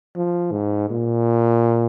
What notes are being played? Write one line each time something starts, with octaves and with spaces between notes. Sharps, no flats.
F3
G#2
A#2